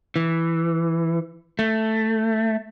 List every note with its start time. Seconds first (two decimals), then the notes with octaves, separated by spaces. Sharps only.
0.16 E3
1.59 A3